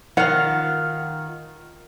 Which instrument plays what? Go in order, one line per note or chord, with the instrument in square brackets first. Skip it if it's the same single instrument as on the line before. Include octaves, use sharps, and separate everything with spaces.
[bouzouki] D#3 F4 F5 [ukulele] F#5